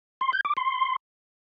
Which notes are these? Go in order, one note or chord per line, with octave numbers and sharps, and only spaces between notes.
C6
G6
D6
C6